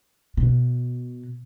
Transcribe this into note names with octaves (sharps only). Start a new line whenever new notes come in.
B2